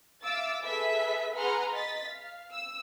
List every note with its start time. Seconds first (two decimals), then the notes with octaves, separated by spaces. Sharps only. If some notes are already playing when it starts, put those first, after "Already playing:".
0.22 E5 F5 D6 E6 A6
0.63 G#4 A4 B4 E5 B6
1.35 G#4 B4 F#5 A#5 C6 F6
1.71 D#5 A6 B6
2.08 F5
2.51 E6